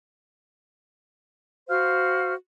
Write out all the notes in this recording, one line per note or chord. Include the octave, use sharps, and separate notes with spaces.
F#4 C5 F5 F6